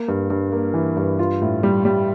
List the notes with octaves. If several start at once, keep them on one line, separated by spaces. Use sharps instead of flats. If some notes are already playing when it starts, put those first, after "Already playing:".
Already playing: A#3
G2
G2
A#3
E3
G2
F4
A2
G3
G3